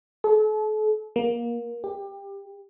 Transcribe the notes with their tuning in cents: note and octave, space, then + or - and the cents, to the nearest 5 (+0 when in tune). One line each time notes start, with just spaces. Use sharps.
A4 -40
A#3 +25
G4 +20